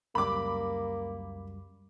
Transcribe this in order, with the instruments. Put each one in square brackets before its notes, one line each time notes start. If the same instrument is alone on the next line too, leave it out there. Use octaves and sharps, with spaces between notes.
[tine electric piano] C#2 F#2 G3 [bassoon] A#3 [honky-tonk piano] B5 D6